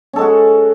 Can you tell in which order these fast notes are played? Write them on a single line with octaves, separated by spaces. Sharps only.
C#4 A4 G#3 F#4